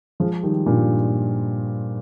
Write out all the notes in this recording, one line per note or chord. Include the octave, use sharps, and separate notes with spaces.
F3 G#3
D#3 G3
G2 A#2